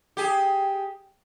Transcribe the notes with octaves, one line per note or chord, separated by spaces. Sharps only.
G4 G#4